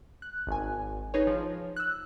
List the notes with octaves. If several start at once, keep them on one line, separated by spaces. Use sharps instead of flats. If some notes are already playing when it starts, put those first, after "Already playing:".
F#6
G#1 G#5
D#4 G#4 B4 C#5
F3
E6 F#6